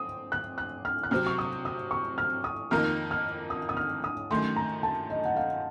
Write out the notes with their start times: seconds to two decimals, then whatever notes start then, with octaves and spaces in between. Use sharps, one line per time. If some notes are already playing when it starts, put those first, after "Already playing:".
Already playing: C4 D#6
0.32 F#6
0.58 F#6
0.85 F6
1.03 F#6
1.11 C3 F#3 C4 F6
1.27 C#6
1.38 D#6
1.65 D#6
1.91 C#6
2.18 F6
2.44 D#6
2.71 F2 D#3 A#3 D#4 A#4 F6
3.11 F6
3.50 D#6
3.69 D#6
3.77 F6
4.04 D#6
4.31 F#2 D#3 A3 C6
4.56 A#5
4.83 A5
5.10 D#5
5.25 F#5
5.36 F5